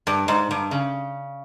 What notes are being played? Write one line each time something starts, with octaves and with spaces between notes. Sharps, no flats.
G2
G#2
G2
C#3